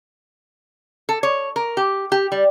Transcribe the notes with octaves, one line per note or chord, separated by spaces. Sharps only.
A4
C#5
A#4
G4
G4
G3